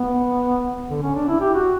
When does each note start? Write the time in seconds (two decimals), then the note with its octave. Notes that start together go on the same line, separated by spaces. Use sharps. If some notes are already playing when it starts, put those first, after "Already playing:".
Already playing: B3
0.90 D3
1.02 C#4
1.15 D4
1.28 E4
1.40 G4
1.54 F#4